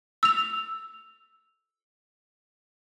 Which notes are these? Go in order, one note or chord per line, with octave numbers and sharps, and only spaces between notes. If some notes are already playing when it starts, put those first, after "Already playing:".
E6 F7